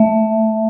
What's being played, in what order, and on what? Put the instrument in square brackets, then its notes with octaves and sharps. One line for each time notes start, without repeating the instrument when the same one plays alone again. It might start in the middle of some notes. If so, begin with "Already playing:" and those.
Already playing: [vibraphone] A3 E5